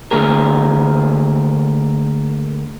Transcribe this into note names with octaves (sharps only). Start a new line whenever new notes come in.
D2 G#2 D3 A#3 G#4 A#4